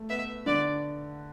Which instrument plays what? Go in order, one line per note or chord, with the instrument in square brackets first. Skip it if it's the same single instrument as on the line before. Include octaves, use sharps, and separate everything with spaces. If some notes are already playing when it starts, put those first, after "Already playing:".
Already playing: [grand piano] A3
[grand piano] B3 [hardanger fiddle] E5
[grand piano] D3 [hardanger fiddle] D5